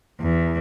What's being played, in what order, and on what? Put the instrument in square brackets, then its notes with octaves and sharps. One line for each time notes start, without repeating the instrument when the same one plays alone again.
[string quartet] E2